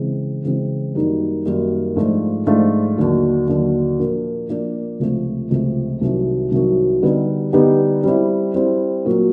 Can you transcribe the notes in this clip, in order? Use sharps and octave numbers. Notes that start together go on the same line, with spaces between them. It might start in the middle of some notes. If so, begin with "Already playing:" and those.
Already playing: C#3 E3 G#3 C4
C#3 E3 G#3 C4
F#2 D#3 G3 A#3 D#4
F#2 D#3 G3 A#3 D#4
G#2 F3 A3 D4 F4
G#2 F3 A3 D4 F4
D#2 D3 F#3
D#2 D3 F#3
A#2 F3 A#3 D4
A#2 F3 A#3 D4
C#2 C3 F3 A3
C#2 C3 F3 A3
C2 C3 D#3 F#3
C2 C3 D#3 F#3
D3 G3 B3 D#4 G4
D3 G3 B3 D#4 G4
G3 C4 E4
G3 C4 E4
A#2 F#3 A#3